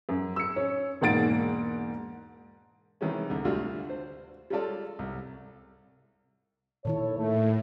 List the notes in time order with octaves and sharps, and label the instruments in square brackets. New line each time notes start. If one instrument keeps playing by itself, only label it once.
[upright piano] F#2
E6 C#7
C#4
E1 G#2 A#3 F#5 A6 D7
[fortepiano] C3 D#3 E3 G3 G#3 C#4
C2 D3
D2 G3 D4 F4 F#4
C5
G3 G#3 C#4 F4 A4 D5
C2
[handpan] A#2 D#3 E4 [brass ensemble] A4 C#5
[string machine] A2 [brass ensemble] A3